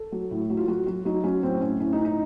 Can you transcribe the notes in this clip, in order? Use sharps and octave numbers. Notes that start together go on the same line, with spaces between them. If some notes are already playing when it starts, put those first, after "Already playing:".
Already playing: A4
F#3
A2
F#3
F4
F#3 F#4
F#3 F#4
F#3 D#4
F#3 C#4
A2 C4
A2 C#4
A2 C#4
D#4
A2
D#4